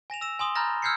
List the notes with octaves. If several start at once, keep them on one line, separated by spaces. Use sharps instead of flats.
G#5 A#6 E7 F7
E6 A#6 E7
G#5 C6 D#6 G7
A#5 B5 F6 G6 A6 A#6
E6 F6 G6 G#6 C7 C#7